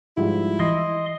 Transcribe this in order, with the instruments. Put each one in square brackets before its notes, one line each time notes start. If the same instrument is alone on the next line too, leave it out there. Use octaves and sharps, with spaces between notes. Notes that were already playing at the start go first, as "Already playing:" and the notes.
[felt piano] G#2 F3 G3 [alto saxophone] E4
[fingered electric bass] E3 [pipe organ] D#5 C6 [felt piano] A#6